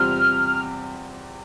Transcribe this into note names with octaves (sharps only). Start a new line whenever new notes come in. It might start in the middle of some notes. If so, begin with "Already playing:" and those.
Already playing: E2 C3 G3 C4 F4 F6